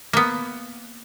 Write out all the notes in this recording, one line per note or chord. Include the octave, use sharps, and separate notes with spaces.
A#3 B3